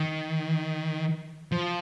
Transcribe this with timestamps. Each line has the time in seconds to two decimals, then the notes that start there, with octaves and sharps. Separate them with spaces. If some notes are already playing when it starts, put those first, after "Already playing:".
Already playing: D#3
1.52 F3